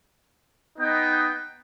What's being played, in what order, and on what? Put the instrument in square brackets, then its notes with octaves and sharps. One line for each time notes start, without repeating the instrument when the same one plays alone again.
[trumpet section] B3 D#4 B4 D#5 G5